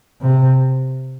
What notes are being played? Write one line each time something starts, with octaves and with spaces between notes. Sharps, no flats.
C3